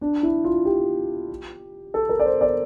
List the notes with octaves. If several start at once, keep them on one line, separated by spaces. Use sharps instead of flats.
D4
E4
F4
G4
A4
A#4
D5
C5
D5